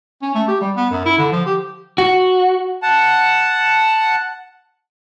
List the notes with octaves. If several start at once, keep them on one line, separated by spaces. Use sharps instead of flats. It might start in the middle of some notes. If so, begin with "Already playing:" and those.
C#4
A3
G4
G3
B3
F#2
E4
D3
F3
G4
F#4
F#5 A5